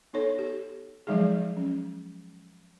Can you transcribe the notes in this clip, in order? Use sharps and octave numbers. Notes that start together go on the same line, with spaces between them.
B3 D#4 A4 C#5
G4
F3 F#3 G#3 D#4 G#4
C#4